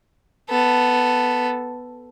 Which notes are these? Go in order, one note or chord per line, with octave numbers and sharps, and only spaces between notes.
B3 A4